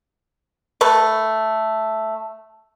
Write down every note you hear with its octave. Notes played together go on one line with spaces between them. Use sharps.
A3 B4